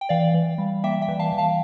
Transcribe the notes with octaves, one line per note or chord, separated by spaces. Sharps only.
G5
E3 D5 F5
E3
G3
A#3 E5 G5
E5 G5
E3
F5 A5
E3
F5 A5